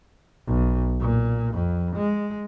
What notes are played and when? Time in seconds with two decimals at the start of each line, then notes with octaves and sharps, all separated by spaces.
0.47 B1
1.00 A#2
1.54 F2
1.96 G#3